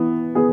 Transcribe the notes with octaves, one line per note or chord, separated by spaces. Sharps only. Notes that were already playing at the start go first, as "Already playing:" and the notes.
Already playing: E3 B3
B3 G#4